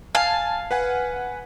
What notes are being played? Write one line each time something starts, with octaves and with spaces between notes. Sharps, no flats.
F5 G#5 A5
B4 F#5 G#5